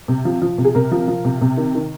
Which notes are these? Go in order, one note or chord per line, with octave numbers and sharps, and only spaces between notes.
C3
F3
F3
C3
G#4
C3 A#4
F3
F3
C3
C3
D#3
D#3